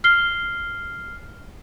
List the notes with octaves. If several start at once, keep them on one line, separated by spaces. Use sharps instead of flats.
F6 C7 G7